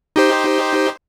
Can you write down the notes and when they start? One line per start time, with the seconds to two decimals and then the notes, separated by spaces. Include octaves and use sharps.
0.16 D#4 G4 C5